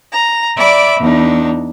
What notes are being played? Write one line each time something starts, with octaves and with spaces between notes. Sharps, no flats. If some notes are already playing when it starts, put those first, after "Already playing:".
A#5
D5 E5 B5 D6
E2 D4 D#4